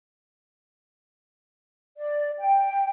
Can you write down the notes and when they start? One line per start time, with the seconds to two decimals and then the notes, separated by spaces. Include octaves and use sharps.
1.98 D5
2.39 G5